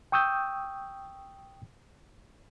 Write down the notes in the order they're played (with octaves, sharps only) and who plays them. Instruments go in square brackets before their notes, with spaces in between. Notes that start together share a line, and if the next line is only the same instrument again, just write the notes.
[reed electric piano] G5 C#6 D#6 E6 G6